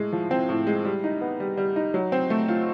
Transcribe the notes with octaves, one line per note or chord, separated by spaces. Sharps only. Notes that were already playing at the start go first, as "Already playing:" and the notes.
Already playing: A2 G#3
F3
C4
A2
G#3
G3
D#4
B3
G3
G3
D#4
F#3
C4
A3
F4